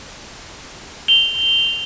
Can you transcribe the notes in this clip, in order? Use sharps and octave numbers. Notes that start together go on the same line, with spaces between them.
F7 G7